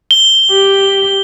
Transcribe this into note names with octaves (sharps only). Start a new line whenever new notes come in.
G7
G4